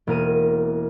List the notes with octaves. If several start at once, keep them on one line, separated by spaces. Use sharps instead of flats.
E1 A#3 A#4 D#7